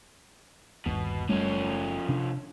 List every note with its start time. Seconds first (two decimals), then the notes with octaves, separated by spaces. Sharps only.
0.86 G1 D#2 B2
1.29 F#1 F3 G3 A3 C#4
2.09 C3 D4